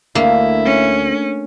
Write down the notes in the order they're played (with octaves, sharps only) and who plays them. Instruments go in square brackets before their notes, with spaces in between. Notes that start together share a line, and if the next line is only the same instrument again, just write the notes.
[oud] D2 [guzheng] A#3 [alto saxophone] E4
[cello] C#4